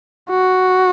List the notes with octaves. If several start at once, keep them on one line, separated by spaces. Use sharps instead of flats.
F#4